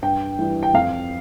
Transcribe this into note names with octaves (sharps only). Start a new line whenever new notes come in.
G2 G5
E3 G3
G5
F2 F5